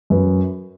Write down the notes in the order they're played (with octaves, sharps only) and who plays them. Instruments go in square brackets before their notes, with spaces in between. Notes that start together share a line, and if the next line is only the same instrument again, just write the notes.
[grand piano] F#2 B4